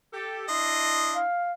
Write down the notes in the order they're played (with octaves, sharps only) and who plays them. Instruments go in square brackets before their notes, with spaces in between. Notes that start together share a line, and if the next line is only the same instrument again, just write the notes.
[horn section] G4 A4
[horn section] D4 E4 C6 [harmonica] D#5
[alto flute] F5